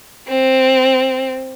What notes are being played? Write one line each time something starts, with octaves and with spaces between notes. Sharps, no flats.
C4